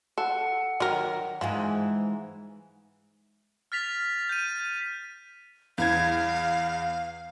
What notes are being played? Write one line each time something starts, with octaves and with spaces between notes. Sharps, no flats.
A4 F#5
D#3 F#3 A#4
G#2 E3 F3 G#3
F6 A6 B6 F7
G6 D#7
E2 F5 G#6